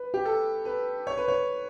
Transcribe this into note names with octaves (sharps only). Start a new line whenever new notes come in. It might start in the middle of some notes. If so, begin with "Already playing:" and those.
Already playing: B4
G4
A4
B4
C#5
B4
C#5